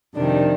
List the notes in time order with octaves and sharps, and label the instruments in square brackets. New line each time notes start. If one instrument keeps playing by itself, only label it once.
[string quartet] F2 C3 D#3 G3 D4